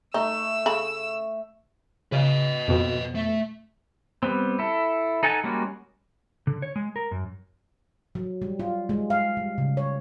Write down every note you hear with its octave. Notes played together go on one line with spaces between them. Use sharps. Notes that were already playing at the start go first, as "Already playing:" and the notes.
A3 D#4 E6
C#3 A4 B5
C#3 B4 D#5
F2 B2
A3
G3 B3 C4
E4 A4
D#4 A4 F#5 G#5 A5
G3 G#3 A#3 C#4 F#4
D3
C#5
G#3
A#4
F#2
F#3
G3
F4
G#3
F5
G3
C#3
C#5